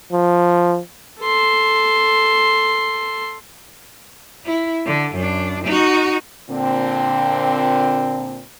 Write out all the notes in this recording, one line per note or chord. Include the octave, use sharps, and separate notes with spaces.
F3
A4 C6
E4
D3
F#2 D4
D#4 F#4
A#2 D3 C4